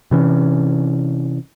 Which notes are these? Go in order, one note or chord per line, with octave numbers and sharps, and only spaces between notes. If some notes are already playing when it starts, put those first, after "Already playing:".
C3 E3 C#4